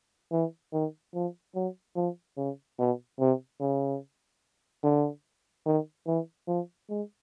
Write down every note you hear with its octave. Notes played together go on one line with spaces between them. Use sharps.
E3
D#3
F3
F#3
F3
C#3
B2
C3
C#3
D3
D#3
E3
F3
G#3